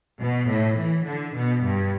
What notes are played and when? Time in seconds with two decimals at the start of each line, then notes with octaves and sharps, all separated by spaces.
0.21 B2
0.49 A2
0.78 E3
1.05 D3
1.35 B2
1.63 G2